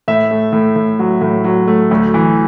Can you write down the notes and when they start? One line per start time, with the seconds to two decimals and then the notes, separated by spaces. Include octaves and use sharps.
0.08 A2 E5
0.31 A3
0.53 A2
0.76 A2
0.99 F#3
1.21 A2
1.44 F#3
1.67 A3
1.91 D2
2.14 E3